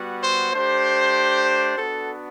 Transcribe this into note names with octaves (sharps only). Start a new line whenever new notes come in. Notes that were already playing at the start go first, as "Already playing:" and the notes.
Already playing: G3 B3 F#4
C5
A3 D4 G4 C5
B3 D4 F#4 A4